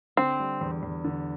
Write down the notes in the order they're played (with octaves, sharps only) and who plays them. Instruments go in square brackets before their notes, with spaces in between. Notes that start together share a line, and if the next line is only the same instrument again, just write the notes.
[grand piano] D3 [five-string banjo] C4
[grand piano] G3
E2
E2
D3